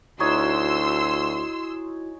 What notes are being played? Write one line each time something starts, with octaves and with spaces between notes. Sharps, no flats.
D2 D#4 E4 F#4 C#5 G#5 C6 E6